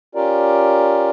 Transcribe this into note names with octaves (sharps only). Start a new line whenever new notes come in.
C#4 F4 G4 A#4 D5